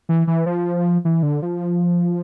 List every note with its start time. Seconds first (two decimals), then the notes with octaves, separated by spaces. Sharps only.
0.09 E3
0.27 E3
0.46 F3
1.05 E3
1.23 D3
1.42 F3